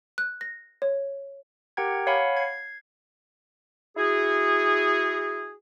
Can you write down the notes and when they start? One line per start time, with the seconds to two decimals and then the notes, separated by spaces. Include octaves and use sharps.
0.18 F#6
0.41 A#6
0.82 C#5
1.77 G4 A#4 F#5 G5 A#5 G#6
2.07 C#5 F5 F#5 G#5 B5
2.37 G#6 C7
3.97 E4 F#4 G#4